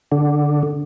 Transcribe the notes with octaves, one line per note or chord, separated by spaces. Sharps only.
D3